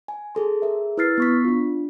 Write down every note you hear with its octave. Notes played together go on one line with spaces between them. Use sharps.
G#5
G#4 A4 C6
G#4 A#4 E5
E4 B4 E6 F6 A6 C7
B3 C#6 B6
D4 F4